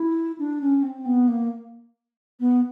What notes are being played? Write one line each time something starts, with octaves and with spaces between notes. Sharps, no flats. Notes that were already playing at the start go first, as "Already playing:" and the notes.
Already playing: E4
D4
C#4
C4
B3
A#3
B3